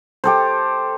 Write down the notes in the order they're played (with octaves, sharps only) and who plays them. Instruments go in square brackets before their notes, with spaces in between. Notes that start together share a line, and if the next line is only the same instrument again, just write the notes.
[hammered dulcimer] G4 A4 C5